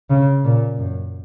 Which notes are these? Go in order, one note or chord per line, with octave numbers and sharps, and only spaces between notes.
C#3
A#2
F#2